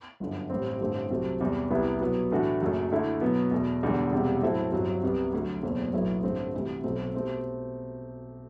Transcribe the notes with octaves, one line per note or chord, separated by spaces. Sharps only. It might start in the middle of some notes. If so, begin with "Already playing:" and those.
G1 F#2 D3
A1 A2 G3 C4
A1 G2 D3 A3 C4
C2 C3 F#3 A3 C4
E2 C3 G3
C2 C3 G3 B3 E4
B2 F#3 B3
A2 E3 A3 D4 F#4
F#1 F#2 F#3 A3
D2 D3 A3 E4
B2 F#3 B3
E2 B2 A3
E1 E2 D3 G3
E1 E2 C3 G3
A2 F#3 C4 E4 A4
G1 G2 F#3 C4
C2 C3 G3 B3
D2 D3 F#3
F#1 E2 B2 A3 C4
B1 A2 F#3 B3 E4
A1 G2 D3 A3 C4
D2 C3 E3 G3
B1 B2 A3 C4
B2 A3 C4 G4